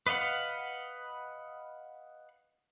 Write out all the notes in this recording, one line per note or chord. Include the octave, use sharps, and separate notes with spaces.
B4 D#5 F5 F#5